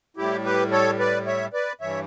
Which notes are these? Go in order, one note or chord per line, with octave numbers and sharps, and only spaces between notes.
A2 G3 E4 G4
G4 B4
A4 C#5
B4 D5
C#5 E5
B4 D5
G2 E3 G3 C#5 E5